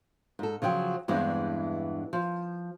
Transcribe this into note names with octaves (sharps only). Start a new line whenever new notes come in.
G#2 A4
C#3 F3 F#3 G5
E2 G2 E3 G#3 C4 D4
F3